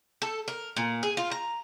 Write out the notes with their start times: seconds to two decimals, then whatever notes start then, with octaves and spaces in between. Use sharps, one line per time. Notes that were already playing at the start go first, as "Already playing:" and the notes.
0.22 A4
0.48 A#4
0.76 A#2
1.03 G#4
1.17 F4
1.31 A#5